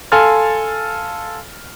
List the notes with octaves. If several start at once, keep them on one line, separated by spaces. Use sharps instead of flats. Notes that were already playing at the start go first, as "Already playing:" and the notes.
A4 F5 G#5 C6 F6 A6